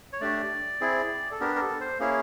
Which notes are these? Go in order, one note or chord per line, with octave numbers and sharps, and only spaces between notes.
C#5
A3 D4 G4 D5
C4 E4 G#4
A4
B3 D4 G4 A#4
A#4
A4
C5
A#3 C#4 E4 G#4 C#5